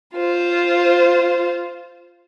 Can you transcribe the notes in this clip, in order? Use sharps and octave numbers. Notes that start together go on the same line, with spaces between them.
F4 C5